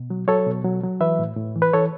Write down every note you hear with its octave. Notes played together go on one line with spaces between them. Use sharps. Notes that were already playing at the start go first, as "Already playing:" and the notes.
Already playing: B2
F#3
F#3 A4 C#5
B2
F#3
F#3
E3 B4 E5
A2
A2
E3
B4
E3 A4 C#5